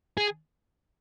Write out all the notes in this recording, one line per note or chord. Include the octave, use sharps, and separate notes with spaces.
G#4